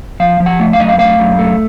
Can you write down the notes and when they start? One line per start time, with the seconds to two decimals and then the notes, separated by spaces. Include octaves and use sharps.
0.20 F3 F5
0.40 F3
0.46 F#5
0.59 A3
0.73 F5
0.80 F#2 D#5
0.88 F5
0.99 A3 F5
1.19 F#2
1.39 A3